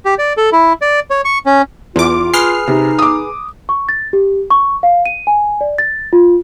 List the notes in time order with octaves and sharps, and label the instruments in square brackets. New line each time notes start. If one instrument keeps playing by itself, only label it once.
[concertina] G4
D5
A4
E4
D5
C#5
C#6
C#4
[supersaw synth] E2 D6 [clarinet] F4
[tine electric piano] G#4 B4 [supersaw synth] F6 C7
[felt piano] C3 [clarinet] D#4
[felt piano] D6 D#6
[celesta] C#6
A6
G4
C#6
F5
D#7
G#5
D5
A6
F4